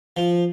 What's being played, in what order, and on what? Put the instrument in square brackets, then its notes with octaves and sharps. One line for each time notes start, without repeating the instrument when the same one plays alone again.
[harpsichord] F3